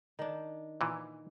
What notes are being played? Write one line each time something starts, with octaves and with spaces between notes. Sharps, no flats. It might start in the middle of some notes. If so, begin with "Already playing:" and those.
D#3 D4
A#2 E3